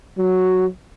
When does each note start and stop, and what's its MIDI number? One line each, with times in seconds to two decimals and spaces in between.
0.18 0.69 54
0.18 0.66 66